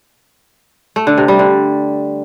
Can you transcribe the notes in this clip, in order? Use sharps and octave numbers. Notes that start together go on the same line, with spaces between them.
A3
D3
C3
G3
D3